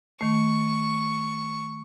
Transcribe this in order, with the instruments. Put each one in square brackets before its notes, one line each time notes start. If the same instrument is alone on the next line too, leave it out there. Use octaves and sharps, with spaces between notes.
[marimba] D#3 A3 [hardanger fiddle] C#6